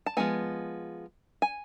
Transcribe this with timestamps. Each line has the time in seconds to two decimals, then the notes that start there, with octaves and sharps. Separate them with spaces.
0.06 A5
0.17 F3 G#3 B3 G#5
1.42 G#5